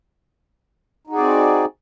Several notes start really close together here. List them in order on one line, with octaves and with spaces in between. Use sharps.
D#4 F#4 G#4 D5 C4